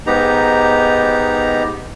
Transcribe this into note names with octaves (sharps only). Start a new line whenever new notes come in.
G#2 B3 D#4 G4 A#5